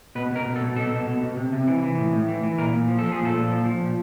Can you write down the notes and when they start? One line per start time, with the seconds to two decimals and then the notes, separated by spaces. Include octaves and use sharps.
0.15 B2 B4
0.31 B2 A#4
0.45 B2
0.56 A4
0.61 B2
0.76 B2 A4
0.91 B2
1.07 B2
1.21 B2
1.37 C3
1.52 C3
1.67 E3
1.83 E3
1.98 A2
2.13 A2
2.28 E3
2.43 E3
2.58 A#2 A#4
2.74 A#2
2.88 F3
2.99 A4
3.04 F3
3.12 G#4
3.19 A#2
3.25 A4
3.34 A#2
3.50 F3
3.65 F3
3.80 A#2